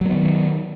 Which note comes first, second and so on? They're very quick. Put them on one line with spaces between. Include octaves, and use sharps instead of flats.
F#3 A#3 B3 D#3